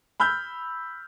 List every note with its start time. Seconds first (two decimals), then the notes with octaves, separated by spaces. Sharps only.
0.20 B5 E6 F6 G6